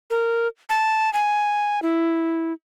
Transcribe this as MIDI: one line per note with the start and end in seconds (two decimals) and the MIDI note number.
0.10 0.47 70
0.69 1.12 81
1.13 1.82 80
1.82 2.53 64